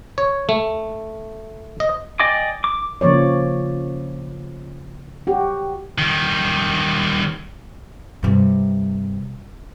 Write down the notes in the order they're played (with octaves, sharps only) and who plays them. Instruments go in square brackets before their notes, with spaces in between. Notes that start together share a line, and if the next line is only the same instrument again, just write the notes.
[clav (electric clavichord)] C#5
A3
D#5
[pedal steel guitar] D5 D#5 G5 G#5 D6
D6
[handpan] C#3 F3 A#3 C#5 D5
F#4 G4
[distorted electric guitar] D#3 G3
[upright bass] G2 C3